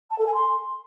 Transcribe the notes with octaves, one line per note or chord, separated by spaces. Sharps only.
A5
A4
G#5
C6